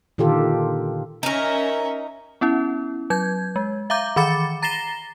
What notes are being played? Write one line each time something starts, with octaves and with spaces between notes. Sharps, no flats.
A#2 D3 D#3 F4 G4 A4
C#4 D#4 A#4 E5
B3 C#4 E4
F#3 G6 G#6
G#3
E5 F5 A#5 D6 G6
D#3 E3 B5 D6 A6 C#7
A#5 A6 A#6 C7 E7 G7